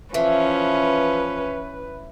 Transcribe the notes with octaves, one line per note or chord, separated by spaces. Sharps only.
E3 F3 C#4 B4